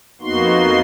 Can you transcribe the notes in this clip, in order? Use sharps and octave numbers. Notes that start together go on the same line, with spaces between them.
F2 A#3 B3 D#4 F#4 C6